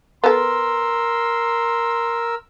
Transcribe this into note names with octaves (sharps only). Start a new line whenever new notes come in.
B3 A4 A#4 C6 E6